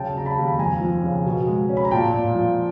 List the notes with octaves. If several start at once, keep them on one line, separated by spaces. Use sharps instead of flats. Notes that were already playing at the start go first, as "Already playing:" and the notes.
Already playing: C#3 F#3 G5 A5
C#3 A#5
A5 B5
D#2
B5
F2 G#5 A#5
F3
C#3
B2
G#3
C#4
B5
A#5
A#2 G5 A5
A#2
F3